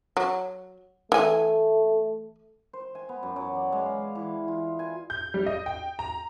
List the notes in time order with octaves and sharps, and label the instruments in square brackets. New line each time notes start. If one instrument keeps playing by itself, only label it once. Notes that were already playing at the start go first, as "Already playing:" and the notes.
[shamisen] F#3
[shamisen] E3 G#5 [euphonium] A3
[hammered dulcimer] C5
G#5
B3
F#2
F#3
D5
G#3
F5
E3
F4
G#5
[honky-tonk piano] G6
G3
D#5
G5
A#5